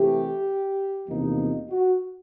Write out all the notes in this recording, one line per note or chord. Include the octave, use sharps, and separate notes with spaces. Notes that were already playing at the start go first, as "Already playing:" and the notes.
Already playing: C3 E3 A3 G4
E2 C3 F3 A#3 D#4
F#4